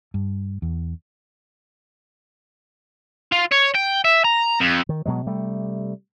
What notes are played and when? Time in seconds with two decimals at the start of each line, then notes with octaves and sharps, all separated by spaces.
0.14 G2
0.62 E2
3.32 F4
3.51 C#5
3.75 G5
4.04 E5
4.25 A#5
4.60 F2
4.89 D#3
5.06 B2 F#3 G#3
5.26 C3 G3 A3